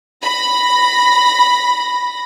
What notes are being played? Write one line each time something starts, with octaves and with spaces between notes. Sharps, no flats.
B5 A#6